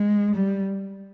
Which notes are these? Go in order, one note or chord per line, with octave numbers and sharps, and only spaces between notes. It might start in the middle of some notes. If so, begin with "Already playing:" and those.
Already playing: G#3
G3